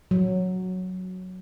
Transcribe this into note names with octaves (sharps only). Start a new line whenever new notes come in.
F#3